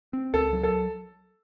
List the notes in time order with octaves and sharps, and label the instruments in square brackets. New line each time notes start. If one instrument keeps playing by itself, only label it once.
[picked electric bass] C4
[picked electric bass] C#2 [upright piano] A4
[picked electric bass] F#3
[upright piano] A4